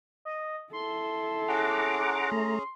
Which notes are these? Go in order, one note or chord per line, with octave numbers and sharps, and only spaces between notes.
D#5
E4 A4 C6
C#4 G#4 F#5 A#5 D6
A3 A#5